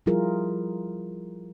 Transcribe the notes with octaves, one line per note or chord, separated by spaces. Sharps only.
F3 G3 E4 F4 G#4 A#4